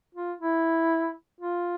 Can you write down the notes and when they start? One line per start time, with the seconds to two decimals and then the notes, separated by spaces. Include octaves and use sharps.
0.15 F4
0.41 E4
1.41 F4